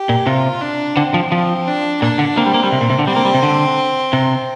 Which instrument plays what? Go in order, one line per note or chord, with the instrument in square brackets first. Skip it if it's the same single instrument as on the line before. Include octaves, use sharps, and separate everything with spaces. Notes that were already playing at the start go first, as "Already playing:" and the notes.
Already playing: [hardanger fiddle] G4
[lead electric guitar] A#2
[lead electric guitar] C3 [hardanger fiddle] F4
[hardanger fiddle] D4
[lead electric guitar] D3 [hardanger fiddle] C4
[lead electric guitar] F3
[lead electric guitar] F3 [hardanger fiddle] C4
[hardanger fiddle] D4
[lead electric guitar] A#2 [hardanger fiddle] D4
[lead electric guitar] D3
[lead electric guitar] A#3 [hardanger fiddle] C4
[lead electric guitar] G3
A#3
G3
C3
A#2
C3
D3
[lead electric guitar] G3 [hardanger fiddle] C4
[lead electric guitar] A#3
G3
C3
D3
C3